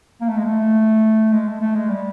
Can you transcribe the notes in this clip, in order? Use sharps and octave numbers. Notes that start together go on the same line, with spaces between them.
A#3
A3
G#3
A3
G#3
A3
A3
G#3
G3